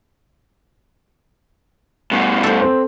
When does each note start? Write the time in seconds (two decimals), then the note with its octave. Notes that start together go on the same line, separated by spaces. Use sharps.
2.11 G2 B2
2.43 A4 C5
2.62 C4